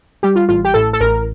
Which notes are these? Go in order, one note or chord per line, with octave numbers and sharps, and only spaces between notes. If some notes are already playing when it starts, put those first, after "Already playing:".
G3 G4
F4
A1 F4
G4
A2 A4
A4
A1 A#4